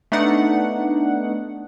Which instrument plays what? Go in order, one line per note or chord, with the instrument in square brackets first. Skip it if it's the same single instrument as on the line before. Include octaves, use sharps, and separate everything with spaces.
[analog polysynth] A3 B3 D4 D#4 F#5